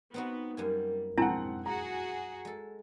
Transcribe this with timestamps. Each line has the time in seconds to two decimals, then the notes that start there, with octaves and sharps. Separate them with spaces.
0.14 B3 C4 D#4 F#4
0.57 F#2 G3 A#3 G#5
1.18 B1 F2 G#2 C4 D4 E4 F#5 A5
1.66 F#4 G#4 A#5
2.45 G#3 A4